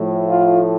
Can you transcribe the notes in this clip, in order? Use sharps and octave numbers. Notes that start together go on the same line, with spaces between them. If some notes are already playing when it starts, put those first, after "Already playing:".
Already playing: A2 F3
F4